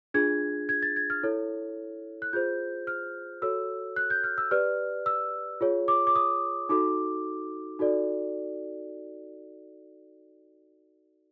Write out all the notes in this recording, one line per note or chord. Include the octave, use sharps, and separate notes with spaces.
D4 F4 G#4 G#6
G#6
A6
G#6
F6
E4 A4 C#5
F#6
F4 G#4 C5 G6
F6
F#4 A4 C#5 E6
F#6
G6
F6
E6
G4 B4 D5 F6
E6
F4 G#4 C#5
D6
D6
D#6
D#4 F#4 A4 D6
D#4 F#4 A4 D5